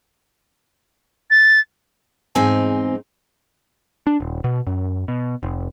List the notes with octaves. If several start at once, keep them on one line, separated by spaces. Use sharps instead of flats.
A6
E2 G#2 C4 D#4 G#5
D4
D#1
B2
F#2
B2
F1